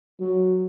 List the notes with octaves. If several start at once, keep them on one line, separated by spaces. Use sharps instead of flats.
F#3